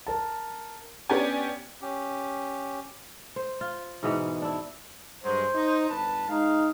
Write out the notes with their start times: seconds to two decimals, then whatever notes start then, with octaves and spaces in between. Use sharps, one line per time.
0.07 A#4 A5
1.10 B3 C#4 D4 G4 D5 G#5
1.81 C#4 G4
3.36 C5
3.61 F4
4.03 G#2 B2 E3 B3
4.42 D4 E4
5.24 G2 F#3 G#3 C5
5.54 D#4
5.89 G1 B4 A5
6.29 G#3 D#4 F5